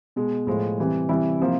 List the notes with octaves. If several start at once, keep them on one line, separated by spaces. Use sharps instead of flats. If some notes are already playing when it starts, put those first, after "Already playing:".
B2 G#3
A2 F3 G#3
C3 E3 G3
C3 E3 G3 E4
C3 F3 A#3